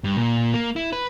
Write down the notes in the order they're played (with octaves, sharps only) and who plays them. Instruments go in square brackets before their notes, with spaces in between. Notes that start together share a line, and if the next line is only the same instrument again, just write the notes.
[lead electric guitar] G2
A#2
A#3
E4
B4